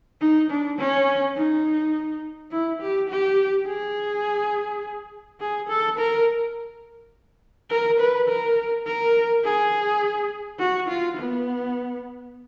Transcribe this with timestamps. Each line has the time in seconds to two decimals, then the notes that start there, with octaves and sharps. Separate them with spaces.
0.21 D#4
0.50 D4
0.78 C#4
1.36 D#4
2.51 E4
2.81 G4
3.09 G4
3.67 G#4
5.40 G#4
5.69 A4
5.98 A#4
7.70 A#4
8.00 B4
8.28 A#4
8.86 A#4
9.44 G#4
10.59 F#4
10.88 F4
11.17 B3